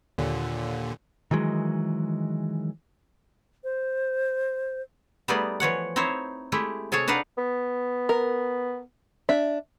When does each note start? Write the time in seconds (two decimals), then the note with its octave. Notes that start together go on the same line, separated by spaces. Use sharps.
0.18 D#2 A#2 D3
1.31 D#3 E3 F#3 G#3
3.64 C5
5.28 G3 A3 B3 D#4 G#4 D5
5.60 E3 F3 C#5 F#5
5.96 C4 D#4 E4 C5 C#5
6.52 G#3 A3 E4 G4
6.92 C3 G#4 A4 C#5 A5
7.08 D4 D#4 B4 F5 F#5
7.38 B3
8.09 A#4
9.29 D4 E5